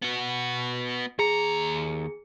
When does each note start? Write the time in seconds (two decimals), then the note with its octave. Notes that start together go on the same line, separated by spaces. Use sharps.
0.02 B3 F#4
1.19 D#2 G#4 A#5 C#7